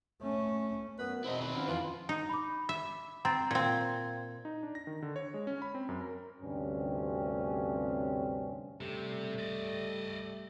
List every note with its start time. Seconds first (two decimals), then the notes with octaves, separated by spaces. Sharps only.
0.22 A3 C#4
0.98 F#2 B3 B4
1.24 E2 B2 C4 E4 D#5
1.41 D#3 B4
1.55 F3 F#3 C#4
1.68 F2 E3 F4
2.09 D#4
2.29 B5 D6
2.69 E5
3.25 C4 A#5 A6
3.51 A#2 C4 F5 G#6
4.45 D#4
4.63 D4
4.75 A#6
4.87 D#3
5.02 D3
5.16 C#5
5.34 G#3
5.47 C#4
5.62 B5
5.75 C4
5.89 F#2
6.01 A#4
6.41 D2 G2 C3 C4 C#4
8.81 C3 G3 A3
9.39 D5 D#5